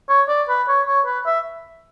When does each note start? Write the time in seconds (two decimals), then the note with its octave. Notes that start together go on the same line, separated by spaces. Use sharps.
0.09 C#5
0.28 D5
0.48 B4
0.68 C#5
0.87 C#5
1.06 B4
1.26 E5